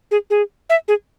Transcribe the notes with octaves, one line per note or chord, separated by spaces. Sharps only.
G#4
G#4
E5
G#4